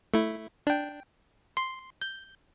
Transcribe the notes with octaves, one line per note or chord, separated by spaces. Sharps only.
A3 E4
D4 G5
C6
G6